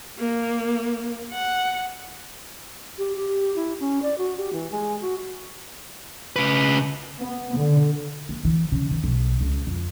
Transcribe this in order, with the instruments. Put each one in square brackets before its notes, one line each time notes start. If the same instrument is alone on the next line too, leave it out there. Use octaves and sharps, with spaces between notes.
[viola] A#3
F#5
[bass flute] G4
G4
E4
C#4
D5
F#4
G4
E3
G#3
F#4
[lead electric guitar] C#3 B4
[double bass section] B3
D3
[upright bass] A#3
E3
C#3
D#3
B1
C#2
F2